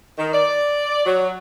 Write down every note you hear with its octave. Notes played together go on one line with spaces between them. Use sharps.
D#3
D5
F#3